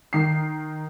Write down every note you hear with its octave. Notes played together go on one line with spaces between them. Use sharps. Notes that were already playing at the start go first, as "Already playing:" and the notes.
D#3 C7